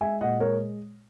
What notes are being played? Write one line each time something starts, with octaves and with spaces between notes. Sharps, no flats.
G#3 E5 G#5
A#2 D#5 F#5
G#3 A#4 C#5